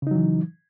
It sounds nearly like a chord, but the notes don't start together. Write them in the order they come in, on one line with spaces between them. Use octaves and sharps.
C#3 D#4 F#3 E3